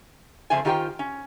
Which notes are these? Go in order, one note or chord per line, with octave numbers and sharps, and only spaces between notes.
F2 C#3 A3 C4 C5 G#5
D#3 F4 G4 A4 C5 G5
C#4